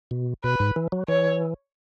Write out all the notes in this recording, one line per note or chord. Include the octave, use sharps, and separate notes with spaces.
B2
B2 B4
G#2
E3
F#3
E3 C#5